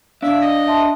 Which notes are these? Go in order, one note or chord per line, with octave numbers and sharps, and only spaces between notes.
D4 D5 E5 F5
D#5
E5 A5 C6